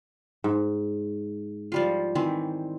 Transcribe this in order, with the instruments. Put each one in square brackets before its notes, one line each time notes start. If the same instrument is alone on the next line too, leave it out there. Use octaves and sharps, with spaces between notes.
[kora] G#2
[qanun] F3 G3 F4
D#3 E3 C4